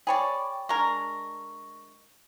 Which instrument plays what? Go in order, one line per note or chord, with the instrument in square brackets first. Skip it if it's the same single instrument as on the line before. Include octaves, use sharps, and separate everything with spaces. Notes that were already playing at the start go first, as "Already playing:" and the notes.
[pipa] G#4 C#5 D5 [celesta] G5 B5 C#6
[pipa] G#3 D4 A#4 [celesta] C#6